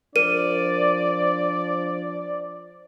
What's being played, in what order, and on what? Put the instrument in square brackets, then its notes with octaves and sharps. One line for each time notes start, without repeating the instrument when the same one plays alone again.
[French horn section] F3 D4 C5 [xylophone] A#4 D#7 [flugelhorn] D5